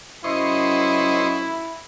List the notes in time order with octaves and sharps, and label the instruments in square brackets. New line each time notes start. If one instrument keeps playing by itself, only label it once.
[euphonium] F#2 [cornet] E4 [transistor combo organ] C5 D#5 C#6